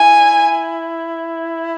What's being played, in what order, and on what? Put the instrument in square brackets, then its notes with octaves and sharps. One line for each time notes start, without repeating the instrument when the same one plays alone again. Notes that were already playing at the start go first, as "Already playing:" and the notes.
Already playing: [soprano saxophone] E4 [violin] G#5